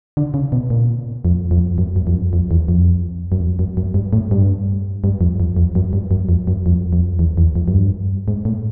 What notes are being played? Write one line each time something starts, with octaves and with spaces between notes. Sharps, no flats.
D3
C#3
B2
A#2
F2
F2
F#2
F#2
F2
F#2
F2
E2
F2
F#2
F2
F#2
F#2
G2
A2
G2
G2
F2
F2
F2
F#2
G2
F#2
F2
F#2
F2
F2
E2
E2
F2
F#2
G2
G#2
A2